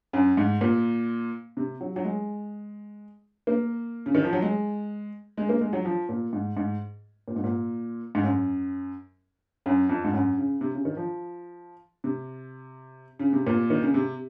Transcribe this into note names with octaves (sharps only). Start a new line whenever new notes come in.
F#2
G#2
A#2
C3
F#3
F#3
G#3
A#3
C#3
D#3
F3
F#3
G#3
G#3
A#3
G#3
F#3
F3
A#2
G#2
G#2
A#2
G#2
A#2
G#2
F#2
F#2
F2
G#2
F#2
C#3
C3
C#3
D#3
F3
C3
C#3
C3
A#2
D#3
C#3
C3